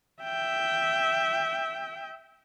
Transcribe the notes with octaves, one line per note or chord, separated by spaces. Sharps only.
E5 G5